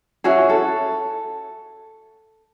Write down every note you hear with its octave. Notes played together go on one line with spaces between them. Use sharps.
C#4 E4 F#4 G#4
A4